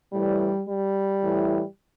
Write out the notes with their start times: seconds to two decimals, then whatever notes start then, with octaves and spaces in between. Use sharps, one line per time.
0.13 A2 E3 G3
0.68 G3
1.23 A2 E3